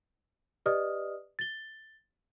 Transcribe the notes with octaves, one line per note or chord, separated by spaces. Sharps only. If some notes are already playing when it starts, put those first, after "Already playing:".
G4 B4 D5 D#5 D#6 F6
A6 G7